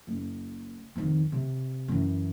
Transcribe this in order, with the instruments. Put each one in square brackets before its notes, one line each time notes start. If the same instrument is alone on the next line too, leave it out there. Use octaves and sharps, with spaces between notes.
[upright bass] F#1
F2 D#3
C3
F#2 E3